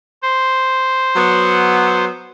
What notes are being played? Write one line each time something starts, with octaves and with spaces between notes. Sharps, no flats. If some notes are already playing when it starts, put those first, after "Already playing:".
C5
F#3 B3